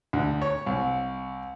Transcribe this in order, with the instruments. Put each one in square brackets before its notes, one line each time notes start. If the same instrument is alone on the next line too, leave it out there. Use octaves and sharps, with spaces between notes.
[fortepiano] D2
C#5
C2